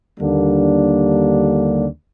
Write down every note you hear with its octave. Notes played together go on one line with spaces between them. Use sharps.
D#2 D3 G3 A#3 D4